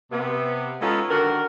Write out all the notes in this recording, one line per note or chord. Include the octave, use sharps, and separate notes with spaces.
C3 B3
G#3 B3 C#4 D#4 F4 A4
D3 D#3 F#4 A#4